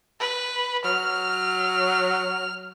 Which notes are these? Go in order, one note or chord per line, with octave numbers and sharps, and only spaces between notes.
B4
F#3 F6